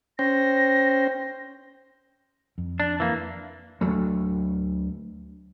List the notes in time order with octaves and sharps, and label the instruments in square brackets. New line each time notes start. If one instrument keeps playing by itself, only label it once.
[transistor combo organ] C#4 C5 G5 [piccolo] A#6
[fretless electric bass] F2
[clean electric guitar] D4
E3 A#3
[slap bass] D2 F#3 A3